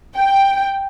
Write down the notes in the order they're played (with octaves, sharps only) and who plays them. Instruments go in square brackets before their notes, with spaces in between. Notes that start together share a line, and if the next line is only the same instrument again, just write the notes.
[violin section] G5